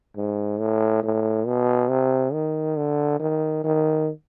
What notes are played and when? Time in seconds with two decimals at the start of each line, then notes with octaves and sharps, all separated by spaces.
0.17 G#2
0.60 A2
1.03 A2
1.47 B2
1.90 C3
2.33 D#3
2.77 D3
3.20 D#3
3.64 D#3